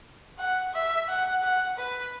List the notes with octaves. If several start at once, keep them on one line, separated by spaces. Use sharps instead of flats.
F#5
E5
F#5
F#5
B4